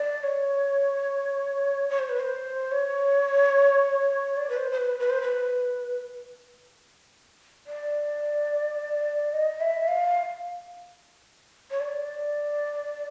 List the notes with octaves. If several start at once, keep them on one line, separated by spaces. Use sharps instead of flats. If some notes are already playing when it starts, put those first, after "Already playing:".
Already playing: D5
C#5
C#5
C5
B4
C5
C#5
D5
B4
C5
C5
B4
B4
C5
B4
D5
D#5
E5
F5
C#5
D5